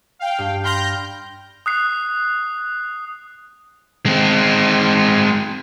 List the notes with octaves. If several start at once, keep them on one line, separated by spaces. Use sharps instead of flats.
F5 G5
G2
G5 B5 C6 F6 G6 A#6
D#6 F#6 C7
G#3 C4